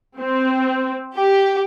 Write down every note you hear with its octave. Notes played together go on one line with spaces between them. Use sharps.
C4
G4